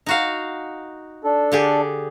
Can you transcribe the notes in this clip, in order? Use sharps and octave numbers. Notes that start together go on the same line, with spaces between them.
D#4 F#4 F5
D4 A4
D3 G4 G#4